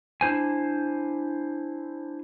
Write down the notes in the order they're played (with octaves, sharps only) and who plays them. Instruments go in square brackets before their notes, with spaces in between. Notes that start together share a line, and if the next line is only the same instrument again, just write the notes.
[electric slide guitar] D4 E4 C5 G#5